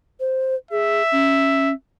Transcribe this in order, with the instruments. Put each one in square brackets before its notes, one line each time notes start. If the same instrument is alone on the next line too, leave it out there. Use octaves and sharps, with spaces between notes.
[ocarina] C5
[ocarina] G#4 [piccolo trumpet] E5
[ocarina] C#4